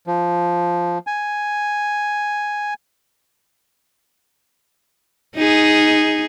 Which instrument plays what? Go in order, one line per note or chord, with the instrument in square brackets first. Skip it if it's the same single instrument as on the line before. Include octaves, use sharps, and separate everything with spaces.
[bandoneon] F3
G#5
[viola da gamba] D#4 G#4